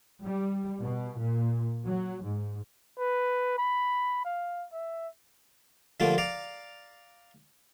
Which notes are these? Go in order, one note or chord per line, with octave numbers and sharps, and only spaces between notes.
G3
B2
A#2
F#3
G#2
B4
B5
F5
E5
D3 F3 G3 A3 A#3 F4
D5 F5 A#5